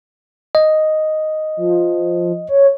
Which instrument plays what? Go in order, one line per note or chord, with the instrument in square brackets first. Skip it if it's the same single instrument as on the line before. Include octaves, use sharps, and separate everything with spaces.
[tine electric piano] D#5
[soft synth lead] F3
C#5